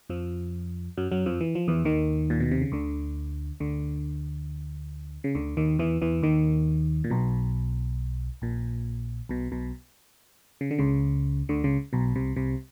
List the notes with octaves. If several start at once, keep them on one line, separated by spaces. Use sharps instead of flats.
F2 F3
F#2 F#3
F#2 F#3
F2 F3
E3
F3
E2 E3
D#2 D#3
A#2
B2
C3
C#3
D2 D3
D2 D3
C#3
D2 D3
D#2 D#3
E2 E3
E2 E3
D#2 D#3
A#2
B1 B2
A#1 A#2
B1 B2
B1 B2
C#3
D3
C#2 C#3
D2 D3
C#2 C#3
B1 B2
C2 C3
C2 C3